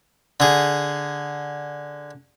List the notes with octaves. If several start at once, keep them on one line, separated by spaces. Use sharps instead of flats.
D3 G#4